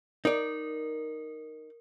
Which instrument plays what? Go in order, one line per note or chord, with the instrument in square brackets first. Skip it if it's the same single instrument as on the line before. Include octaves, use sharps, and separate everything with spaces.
[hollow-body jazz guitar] D#4 D5 [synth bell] A#4